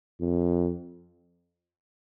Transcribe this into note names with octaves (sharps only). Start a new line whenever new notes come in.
F2